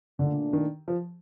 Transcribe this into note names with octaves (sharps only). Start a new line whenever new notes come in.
A#2 D3 A3 D4
D#3
F3